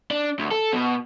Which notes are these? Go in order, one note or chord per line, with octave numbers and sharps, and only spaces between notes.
D4
D2
A4
B2